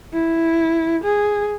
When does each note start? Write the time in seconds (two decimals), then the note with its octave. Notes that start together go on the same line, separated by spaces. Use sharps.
0.13 E4
1.04 G#4